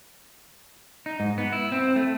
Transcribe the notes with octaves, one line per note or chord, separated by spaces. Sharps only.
D#4
G#2
B3
E4
C4
A3